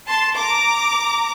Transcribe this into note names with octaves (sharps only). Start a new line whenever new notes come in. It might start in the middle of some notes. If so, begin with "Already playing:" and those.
A5 C6
A#5 D6